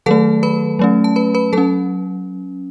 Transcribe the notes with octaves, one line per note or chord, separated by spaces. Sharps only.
D#3 F#3 A3 A4 A5
B4 B5
F#3 A3 C#4
A5
B4 B5
B4 B5
F#3 C#4 A4 A5